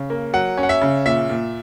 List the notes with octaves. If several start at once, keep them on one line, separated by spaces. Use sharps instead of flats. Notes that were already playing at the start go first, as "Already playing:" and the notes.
Already playing: C#3
A#3
F#3 F#5
C#4
F#5
E5
C#3
A#2 E5
A#2